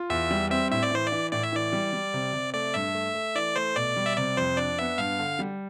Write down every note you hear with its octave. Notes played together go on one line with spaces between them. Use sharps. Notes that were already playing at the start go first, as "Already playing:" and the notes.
Already playing: F4
E2 E5
G3
C4 E5
A2 E5
D5
E3 C5
D5
E3
A2 D5
E5
E3 D5
G3
G3
C3
C3
A3 D5
G2 E5
A3
A3
E3 D5
A3 C5
B2 D5
G3
E5
C3 D5
F2 C5
D4 D5
B3 E5
G2 F5
D3
G3